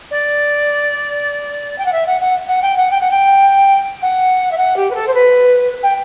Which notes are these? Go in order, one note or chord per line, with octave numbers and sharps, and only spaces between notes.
D5
G5
F#5
E5
F#5
F#5
F#5
G5
F#5
G5
F#5
G5
F#5
E5
F#5
G4
B4
A4
C5
B4
G5